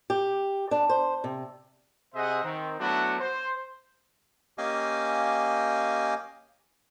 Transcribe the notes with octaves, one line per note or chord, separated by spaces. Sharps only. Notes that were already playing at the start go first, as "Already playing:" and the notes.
G4
D4
C5
C3
C3 G#4 C5 D#5 E5 F#5
D#3 C4
F#3 A3 B3 D4 E4 F#4
C5
A#3 C#4 G4 D#5 F5 G#5